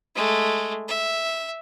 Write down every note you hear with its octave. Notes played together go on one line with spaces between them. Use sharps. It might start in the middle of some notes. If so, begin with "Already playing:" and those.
G#3 A3
E5